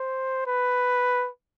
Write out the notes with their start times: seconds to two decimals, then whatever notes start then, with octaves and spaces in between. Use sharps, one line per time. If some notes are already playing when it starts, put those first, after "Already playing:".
Already playing: C5
0.47 B4